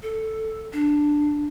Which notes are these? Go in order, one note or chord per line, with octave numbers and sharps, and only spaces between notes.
A4
D4